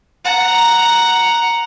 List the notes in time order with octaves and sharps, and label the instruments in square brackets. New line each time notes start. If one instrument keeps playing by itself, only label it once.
[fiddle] F#5 A#5